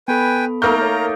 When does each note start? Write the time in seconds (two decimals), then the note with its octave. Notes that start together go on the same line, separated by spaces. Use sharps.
0.08 B3 A4 B4 G5 G#5 B5
0.62 A3 A#3 D#4 A#4 A#5 F6 G6
0.78 C#5 A6